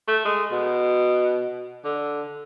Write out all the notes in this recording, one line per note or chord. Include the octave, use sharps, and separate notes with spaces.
A3
G#3
B2
D3